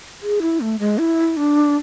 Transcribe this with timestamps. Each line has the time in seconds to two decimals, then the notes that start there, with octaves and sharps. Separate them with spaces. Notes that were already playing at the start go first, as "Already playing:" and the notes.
0.23 G#4
0.42 E4
0.60 A3
0.79 G#3
0.98 E4
1.37 D4